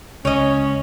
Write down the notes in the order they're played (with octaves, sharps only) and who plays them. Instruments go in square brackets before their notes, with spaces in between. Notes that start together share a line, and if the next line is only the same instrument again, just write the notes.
[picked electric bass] C#2 [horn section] C#4 [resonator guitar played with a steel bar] C#5 D#5